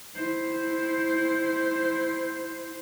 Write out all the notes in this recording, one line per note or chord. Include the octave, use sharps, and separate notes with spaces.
E4 C5